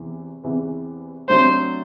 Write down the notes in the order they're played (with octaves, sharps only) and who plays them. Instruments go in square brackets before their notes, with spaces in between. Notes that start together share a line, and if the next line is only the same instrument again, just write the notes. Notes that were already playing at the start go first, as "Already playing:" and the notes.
Already playing: [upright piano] E2 C3 E3
E2 C3 E3 B3
[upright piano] C3 F#3 A3 D4 [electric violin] C5